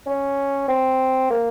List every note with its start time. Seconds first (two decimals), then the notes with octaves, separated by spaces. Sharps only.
0.06 C#4
0.68 C4
1.30 A#3